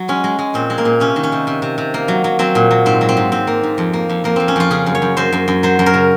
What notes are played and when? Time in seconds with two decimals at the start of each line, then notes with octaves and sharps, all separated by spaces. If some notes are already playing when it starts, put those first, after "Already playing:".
Already playing: F#3
0.08 G#3 C#4
0.24 G#3
0.39 G#3
0.54 A#2 C4
0.70 G#3
0.78 A#3
0.85 A#2
1.00 C3 C#4
1.16 D#3
1.23 C#4
1.32 C3
1.47 C3
1.62 C3
1.78 C3
1.94 A#3
2.08 F#3
2.24 F#3
2.39 F#3 C4
2.55 A#2
2.71 F#3
2.86 G#2 C4
3.01 F#3
3.09 C4
3.17 G#2
3.32 G#2 C4
3.47 A#3
3.63 G#2
3.78 F2
3.93 A#3
4.09 F2
4.24 F2 A#3
4.36 F2 C4
4.48 C#4
4.56 F2 F4
4.71 C#3 G#4
4.86 F#2
4.95 C#5
5.02 F#2
5.17 F#2 C5
5.33 F#2
5.48 F#2
5.63 F#3 C5
5.79 F#2
5.86 A#4
5.94 C#3